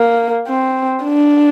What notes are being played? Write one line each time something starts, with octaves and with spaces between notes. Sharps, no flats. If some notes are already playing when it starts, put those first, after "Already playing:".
Already playing: A#3
C4
D4